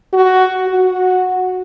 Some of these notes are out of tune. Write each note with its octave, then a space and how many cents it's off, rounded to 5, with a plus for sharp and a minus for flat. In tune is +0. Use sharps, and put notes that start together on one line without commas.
F#4 +10
F#4 -10